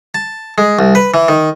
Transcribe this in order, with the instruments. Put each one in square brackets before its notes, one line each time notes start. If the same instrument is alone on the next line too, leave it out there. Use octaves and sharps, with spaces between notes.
[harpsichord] A5
G#3
C2
B4
E3
D#3